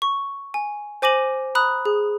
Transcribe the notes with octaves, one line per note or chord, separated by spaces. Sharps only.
C#6
G#5
C5 G#5 D6 A#6 D#7 F#7
A#5 B5 D#6 F#6
G#4